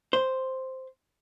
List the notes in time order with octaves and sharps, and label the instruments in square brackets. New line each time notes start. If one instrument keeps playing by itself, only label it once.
[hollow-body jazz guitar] C5